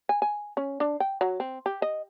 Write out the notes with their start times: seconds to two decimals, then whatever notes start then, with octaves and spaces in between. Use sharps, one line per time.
0.09 G#5
0.22 G#5
0.57 C#4
0.80 D4
1.00 G5
1.21 F#3
1.40 C4
1.66 G4
1.82 D#5